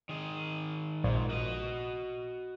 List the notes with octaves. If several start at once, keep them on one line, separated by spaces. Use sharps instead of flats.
D#3 G#4
A#1 G#2
F#4 D#5